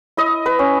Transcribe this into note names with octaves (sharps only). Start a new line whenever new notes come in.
E4 D#5
B4
C#4